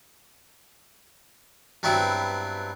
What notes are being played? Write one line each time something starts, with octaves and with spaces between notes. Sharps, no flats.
G2 F#3 B3 C4 E4